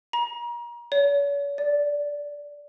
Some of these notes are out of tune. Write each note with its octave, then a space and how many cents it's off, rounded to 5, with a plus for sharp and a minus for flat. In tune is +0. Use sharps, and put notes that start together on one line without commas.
A#5 +35
C#5 +45
D5 -10